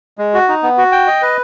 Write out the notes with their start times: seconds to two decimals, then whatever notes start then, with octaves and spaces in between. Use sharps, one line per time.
0.18 G#3
0.34 F#4
0.48 D#4
0.63 B3
0.78 F#4
0.92 G5
1.07 D#5
1.22 B4